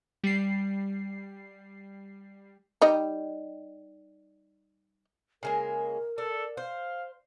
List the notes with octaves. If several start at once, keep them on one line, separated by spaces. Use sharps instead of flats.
G3 C7
G3 D#4 D#5
C#3 G#3 A#3 A#4
D4 A4
C5 F5